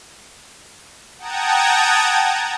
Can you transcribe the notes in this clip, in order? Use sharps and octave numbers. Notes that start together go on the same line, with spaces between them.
F#5 G5 A5 A#5 D#6 G#6